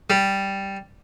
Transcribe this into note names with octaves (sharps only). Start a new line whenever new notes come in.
G3